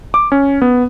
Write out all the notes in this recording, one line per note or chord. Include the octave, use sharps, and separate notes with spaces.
D6
C#4
B3